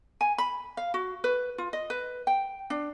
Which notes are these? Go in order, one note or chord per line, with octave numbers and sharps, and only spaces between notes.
G#5
B5
F5
F#4
B4
F4
D#5
B4
G5
D4